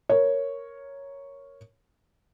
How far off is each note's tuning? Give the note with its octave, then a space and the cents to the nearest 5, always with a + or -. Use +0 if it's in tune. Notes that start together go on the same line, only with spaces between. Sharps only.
A#4 +0 C#5 +0